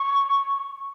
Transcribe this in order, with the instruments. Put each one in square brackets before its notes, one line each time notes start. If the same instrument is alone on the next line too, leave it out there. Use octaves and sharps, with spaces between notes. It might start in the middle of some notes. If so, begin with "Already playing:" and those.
Already playing: [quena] C#6